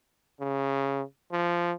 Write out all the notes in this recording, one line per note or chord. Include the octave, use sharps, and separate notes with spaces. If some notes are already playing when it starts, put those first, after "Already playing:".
C#3
F3